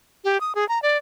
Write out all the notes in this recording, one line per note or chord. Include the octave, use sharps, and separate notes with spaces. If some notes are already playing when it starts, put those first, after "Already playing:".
G4
D#6
G#4
A#5
D5